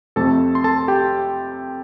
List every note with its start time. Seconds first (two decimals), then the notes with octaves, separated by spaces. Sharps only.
0.16 F2 C3 A3 A4 A5
0.55 C6
0.64 A4 A5
0.88 G4 G5